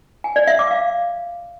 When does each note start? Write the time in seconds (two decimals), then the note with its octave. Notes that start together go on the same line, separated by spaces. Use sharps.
0.24 G#5
0.36 D5
0.47 E5
0.59 D6
0.71 F5